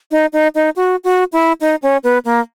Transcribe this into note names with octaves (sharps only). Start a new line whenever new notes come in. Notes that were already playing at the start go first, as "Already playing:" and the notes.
D#4
D#4
D#4
F#4
F#4
E4
D#4
C#4
B3
A#3